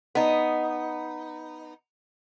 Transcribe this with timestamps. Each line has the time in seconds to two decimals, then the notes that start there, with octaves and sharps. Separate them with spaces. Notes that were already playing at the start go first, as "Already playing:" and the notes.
0.15 B3 D#4